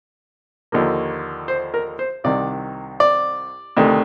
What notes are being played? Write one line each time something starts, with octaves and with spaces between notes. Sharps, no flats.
D#2 D3 F3 A#3
C5
A#4
C5
C2 C3 D#3 D5
D5
D2 C3 D#3 A3